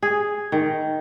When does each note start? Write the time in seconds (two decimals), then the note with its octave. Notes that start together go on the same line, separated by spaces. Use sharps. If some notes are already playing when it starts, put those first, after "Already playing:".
0.03 G#4
0.52 D#3